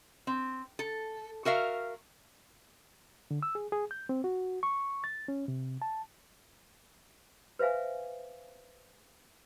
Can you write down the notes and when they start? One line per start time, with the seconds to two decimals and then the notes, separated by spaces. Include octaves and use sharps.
0.27 C4
0.79 A4
1.45 F#4 A#4 E5 F5
3.31 D3
3.43 E6
3.55 G#4
3.72 G#4
3.91 G6
4.09 C4
4.24 F#4
4.63 C#6
5.04 A6
5.28 C#4
5.48 C3
5.82 A5
7.59 B4 C5 E5 F5 G#5